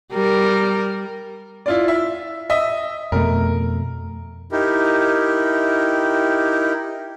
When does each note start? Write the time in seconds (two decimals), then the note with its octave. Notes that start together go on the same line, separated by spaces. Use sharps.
0.13 G3 A#4
1.66 E4 F4 D5
1.88 E5
2.50 D#5 E5
3.12 F2 B2 A3 A#4
4.52 D#4 E4 G4 A#4